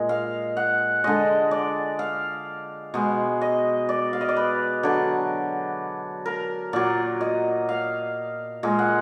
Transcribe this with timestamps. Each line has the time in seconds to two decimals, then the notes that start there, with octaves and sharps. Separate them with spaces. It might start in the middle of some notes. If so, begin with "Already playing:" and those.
Already playing: A#2 G#3 D#5
0.09 F5
0.57 F#5
1.04 D3 G#3 D#5
1.51 D5
1.99 F5
2.94 B2 G#3
3.41 D#5
3.89 D5
4.13 F5
4.21 D#5
4.29 D5
4.36 B4
4.83 D3 F#3 D5
6.26 A#4
6.73 A#2 F#3 D5
7.21 D#5
7.69 F5
8.63 A#2 G#3
8.79 F#5